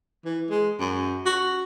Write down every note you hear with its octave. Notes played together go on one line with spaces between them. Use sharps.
E3
G#3
F#2
F#4